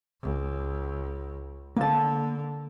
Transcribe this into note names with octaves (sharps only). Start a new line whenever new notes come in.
C#2
D3 A#3 A5